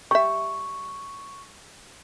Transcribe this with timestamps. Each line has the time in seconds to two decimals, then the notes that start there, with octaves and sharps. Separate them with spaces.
0.11 G3 E5 C#6